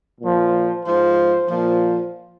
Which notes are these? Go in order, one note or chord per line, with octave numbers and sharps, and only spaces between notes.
A#2 F3
G#2 F3 C5
A#2 F3